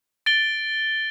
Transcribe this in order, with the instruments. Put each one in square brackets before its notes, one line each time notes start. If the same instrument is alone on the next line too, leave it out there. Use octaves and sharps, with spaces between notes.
[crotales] A6 D7 G7